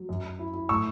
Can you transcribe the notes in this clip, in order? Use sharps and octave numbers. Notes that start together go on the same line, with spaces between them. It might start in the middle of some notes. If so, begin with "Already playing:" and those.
Already playing: F#3
F#2
F#2
E4
E4
A2 C#6 E6